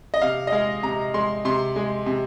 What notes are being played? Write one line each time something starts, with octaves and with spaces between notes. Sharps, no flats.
D#5
C3 F5
D#5
G#3 F5
C3 A#5
G#3 C6
C3 C6
G#3
C3